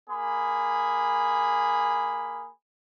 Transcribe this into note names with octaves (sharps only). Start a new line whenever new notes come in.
A#3 G#4 B5